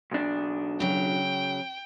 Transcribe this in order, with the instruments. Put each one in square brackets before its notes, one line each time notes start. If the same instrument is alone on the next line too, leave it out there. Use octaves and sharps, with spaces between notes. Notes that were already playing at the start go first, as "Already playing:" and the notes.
[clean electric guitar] B1 D4
[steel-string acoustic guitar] C#3 F#3 [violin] G5